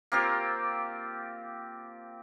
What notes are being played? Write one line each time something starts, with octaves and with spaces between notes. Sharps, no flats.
A#3 C4 F4 G4